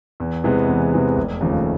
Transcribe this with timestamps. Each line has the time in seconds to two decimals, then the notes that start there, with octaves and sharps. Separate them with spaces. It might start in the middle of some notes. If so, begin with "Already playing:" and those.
0.20 E2
0.44 C3 E3 G#3 B3
0.68 E2
0.93 C3 E3 G#3 B3
1.17 F1
1.40 D#2 C#3 F3 A3